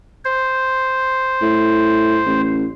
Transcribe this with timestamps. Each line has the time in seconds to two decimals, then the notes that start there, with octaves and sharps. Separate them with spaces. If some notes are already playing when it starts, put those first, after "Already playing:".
0.25 C5
1.42 A2
2.26 A1